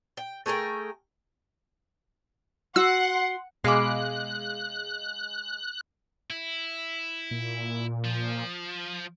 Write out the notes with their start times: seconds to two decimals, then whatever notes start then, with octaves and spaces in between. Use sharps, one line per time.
0.17 G5
0.46 A3 G#4 A#4 G5
2.76 F#4 F#5 C6 E6
3.64 B2 G#3 F5 B5 D6 F#6
6.30 E4
7.31 A#2
8.05 F3